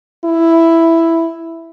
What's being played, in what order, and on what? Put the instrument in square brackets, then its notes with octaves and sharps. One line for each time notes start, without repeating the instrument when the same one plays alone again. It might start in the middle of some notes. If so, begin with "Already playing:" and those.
[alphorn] E4